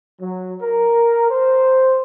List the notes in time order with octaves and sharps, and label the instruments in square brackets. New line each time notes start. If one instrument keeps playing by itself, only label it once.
[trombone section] F#3
A#4
C5